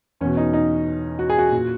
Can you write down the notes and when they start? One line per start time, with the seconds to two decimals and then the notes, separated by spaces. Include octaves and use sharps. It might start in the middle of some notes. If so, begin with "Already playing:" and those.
0.21 E2 B2 C#4
0.37 D#4
0.53 D#4
1.19 F#4
1.29 G#4
1.38 F#4
1.52 A#2